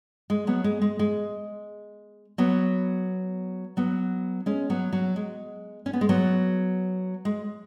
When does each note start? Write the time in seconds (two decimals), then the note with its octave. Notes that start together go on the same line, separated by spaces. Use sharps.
0.30 G#3
0.47 F#3 B3
0.64 G#3
0.82 G#3
0.99 G#3
2.38 F#3 B3
3.77 F#3 B3
4.46 G#3 C#4
4.70 F#3 B3
4.93 F#3
5.16 G#3
5.86 C#4
5.93 B3
6.01 G#3
6.09 F#3 B3
7.25 G#3